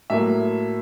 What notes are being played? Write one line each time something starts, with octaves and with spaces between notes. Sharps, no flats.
A2 F#3 A#3 E5